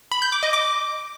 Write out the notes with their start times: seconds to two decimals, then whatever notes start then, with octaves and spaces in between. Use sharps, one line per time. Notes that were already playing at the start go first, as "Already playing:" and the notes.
0.12 B5
0.22 G6
0.32 D6
0.43 D#5
0.53 D6